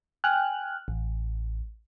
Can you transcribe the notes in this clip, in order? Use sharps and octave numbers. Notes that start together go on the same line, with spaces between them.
G5 G#5 F6 F#6
A1